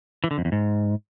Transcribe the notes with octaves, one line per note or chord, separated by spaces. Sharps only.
E3
D3
F2
E2
G#2